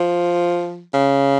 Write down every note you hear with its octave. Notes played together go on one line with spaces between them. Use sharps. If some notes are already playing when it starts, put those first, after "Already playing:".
Already playing: F3
C#3